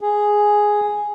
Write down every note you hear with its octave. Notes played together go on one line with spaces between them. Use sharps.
G#4